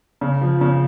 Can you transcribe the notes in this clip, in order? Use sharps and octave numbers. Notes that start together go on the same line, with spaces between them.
C#3
F3
C#3